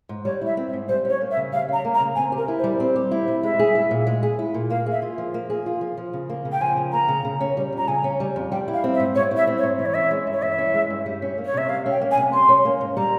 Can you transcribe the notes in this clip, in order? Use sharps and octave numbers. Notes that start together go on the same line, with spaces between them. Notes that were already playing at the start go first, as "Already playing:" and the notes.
G#2
G3 C#5
E4 E5
C4
E5
G#2
G3 C5
C#4 C#5
A#3
E5
C#3
G3 F5
C#4 A#5
A#3
A#5
C#3
C4 G#5
G4
A#4
E4
C5
G3
C4 C5
G4
E4
G3
G#3 E5
G#4
E4
A#2
G#3
G#4
E4
A#2
A#3 F5
G#4
E5
F4
F3
A#3
G#4
F4
F3
F3
C#3
A#3
C#3
G5
F3 G#5
C#3
A#3 A#5
C#3
C#3
C#4
G3
F2
A#5
C#3 G#5
C#4
G3
F2
G3 G5
E4
F5
C4
E5
G#2
G3 C#5
E4
E5
C4
C#5
G#2
E3 E5
C#5
C#4 E5
G#3
G2
C#5
E3 E5
C#4
G#3
G2
G3
C#4
A#3
C#5
C3 E5
G3 F5
C#4
G5
A#3
G#5
C3
G3 C6
C#4
A#3
G#2
G3 A#5